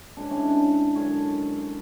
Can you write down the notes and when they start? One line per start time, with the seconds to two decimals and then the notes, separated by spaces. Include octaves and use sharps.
0.17 C#3 G#3 C#4 D4
0.31 C#4 E4
0.43 D4
0.57 D4
0.95 F#2 D3 G#3 C#4 A4 C#5